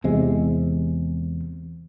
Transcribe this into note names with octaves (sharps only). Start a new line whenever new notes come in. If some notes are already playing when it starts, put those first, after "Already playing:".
E2 C3 G#3